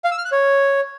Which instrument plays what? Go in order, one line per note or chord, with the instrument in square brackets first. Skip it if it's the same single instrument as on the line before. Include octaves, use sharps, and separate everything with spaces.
[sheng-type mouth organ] F5
E6
F6
F#6
C#5